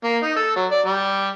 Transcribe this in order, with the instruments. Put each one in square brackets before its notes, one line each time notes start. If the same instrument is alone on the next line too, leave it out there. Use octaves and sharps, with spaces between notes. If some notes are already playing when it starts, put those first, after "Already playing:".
[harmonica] A#3
D#4
A4
F#3
D5
G3